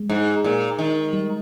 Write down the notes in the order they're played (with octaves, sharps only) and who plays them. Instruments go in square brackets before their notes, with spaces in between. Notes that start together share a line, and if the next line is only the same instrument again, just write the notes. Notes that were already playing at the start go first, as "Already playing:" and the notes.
Already playing: [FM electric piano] G#3
[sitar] G#2
A#2
D#3
[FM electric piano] G3